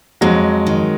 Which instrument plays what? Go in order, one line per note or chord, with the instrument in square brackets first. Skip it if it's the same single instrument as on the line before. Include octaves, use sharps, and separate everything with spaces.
[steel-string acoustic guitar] F2 [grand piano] F#3 G#3
[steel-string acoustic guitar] D#3